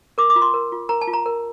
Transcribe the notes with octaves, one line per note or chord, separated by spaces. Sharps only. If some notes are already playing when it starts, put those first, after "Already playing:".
A#4 D6
D6
F4
C6
A#4
F4
A#4 A#5
A5
F4
A#5
A#4